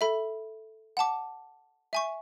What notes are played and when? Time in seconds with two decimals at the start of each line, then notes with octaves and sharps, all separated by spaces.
0.01 A4 E5 B5
0.97 F#5 A5 D6
1.93 E5 G#5 C#6